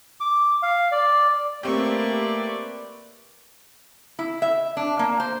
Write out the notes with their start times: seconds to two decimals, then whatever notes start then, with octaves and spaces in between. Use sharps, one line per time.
0.20 D6
0.63 F5
0.92 D5
1.63 A3 A#3 C4 G4 B4 D5 C#6
4.19 E4
4.42 E5
4.77 D4
4.99 A#3
5.20 C5